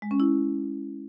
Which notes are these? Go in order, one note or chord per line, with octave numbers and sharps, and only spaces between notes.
G#3
C#4
E4